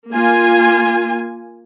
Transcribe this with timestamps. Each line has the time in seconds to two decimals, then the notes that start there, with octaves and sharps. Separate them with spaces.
0.11 A#3 F4 G#5